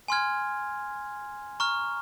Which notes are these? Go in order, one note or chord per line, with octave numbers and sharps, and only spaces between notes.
G#5 C6 F6 G#6
A#5 C#6 F6